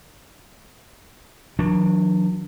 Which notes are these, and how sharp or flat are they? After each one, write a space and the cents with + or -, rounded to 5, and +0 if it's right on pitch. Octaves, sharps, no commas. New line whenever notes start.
D#3 +40 F#3 -30 D4 +0